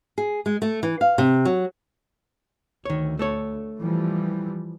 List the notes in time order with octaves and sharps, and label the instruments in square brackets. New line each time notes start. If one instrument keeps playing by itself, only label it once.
[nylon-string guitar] G#4
G#3
A3
E3
F5
C3
F#3
[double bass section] D2 [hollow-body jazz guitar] D#3 C#5
[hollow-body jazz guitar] A3 A4 C#5
[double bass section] E3 F3 G3